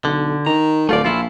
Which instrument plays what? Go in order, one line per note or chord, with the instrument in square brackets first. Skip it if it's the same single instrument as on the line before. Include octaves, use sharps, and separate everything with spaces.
[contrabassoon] B1 [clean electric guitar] D3
[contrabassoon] D#3 [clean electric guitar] A#5
[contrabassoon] D1 [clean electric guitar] A3 F4 D5
[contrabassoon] A#1 [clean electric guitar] E4 F4